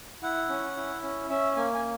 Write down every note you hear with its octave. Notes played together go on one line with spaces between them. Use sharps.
E4 F#5
C#4
E4
C#4
C#4 E5
A#3 G#5
G#5